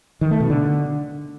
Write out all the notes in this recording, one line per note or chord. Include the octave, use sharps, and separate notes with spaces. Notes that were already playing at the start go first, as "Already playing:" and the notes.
D#3
A3
B2
D3